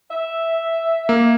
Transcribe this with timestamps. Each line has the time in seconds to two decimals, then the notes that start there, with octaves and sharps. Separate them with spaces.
0.11 E5
1.09 A#3